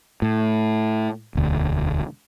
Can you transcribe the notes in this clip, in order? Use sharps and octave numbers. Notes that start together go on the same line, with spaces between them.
A2
E1 D2